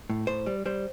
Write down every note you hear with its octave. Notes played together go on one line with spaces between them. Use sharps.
A2
A2 C5
G3
G3 C5